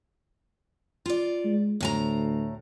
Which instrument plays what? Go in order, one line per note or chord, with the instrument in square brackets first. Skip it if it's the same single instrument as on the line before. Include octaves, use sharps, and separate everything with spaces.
[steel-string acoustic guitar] F4 D5
[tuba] G#3
[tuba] D2 [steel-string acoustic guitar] A2 G#5 A#5